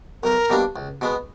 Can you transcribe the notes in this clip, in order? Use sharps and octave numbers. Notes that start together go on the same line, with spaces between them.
B1 A#4
B2 G3 A#3 D4
C#2
B2 G#3 B3